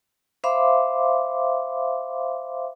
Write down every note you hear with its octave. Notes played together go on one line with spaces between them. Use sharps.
C5 E5 F5 B5 C6 D6